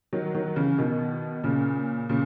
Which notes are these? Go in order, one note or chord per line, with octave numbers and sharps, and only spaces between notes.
D#3 F#3
D#3 F#3
C#3 E3
B2 D#3
A#2 C#3
A#2 C#3